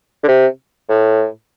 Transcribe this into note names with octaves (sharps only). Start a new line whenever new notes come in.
D3
C3
A2